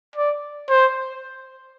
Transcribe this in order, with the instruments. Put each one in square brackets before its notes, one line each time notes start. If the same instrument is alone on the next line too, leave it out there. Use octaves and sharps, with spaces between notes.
[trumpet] D5
C5